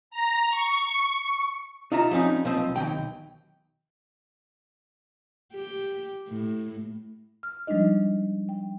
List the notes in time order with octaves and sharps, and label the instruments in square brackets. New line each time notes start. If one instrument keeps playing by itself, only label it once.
[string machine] A#5
C#6
[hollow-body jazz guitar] D#4 F4 E5 A#5
F3 G3 C4 C#4 D#4
B1 F3 C4 D#5
B1 G2 D#3 G5
[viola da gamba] G4
A2
[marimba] F6
F3 G3 G#3 D4 D#4 D#5
G5